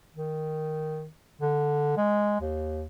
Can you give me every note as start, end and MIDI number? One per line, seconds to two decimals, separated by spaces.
0.15 1.07 51
1.41 1.96 50
1.97 2.37 56
2.41 2.85 39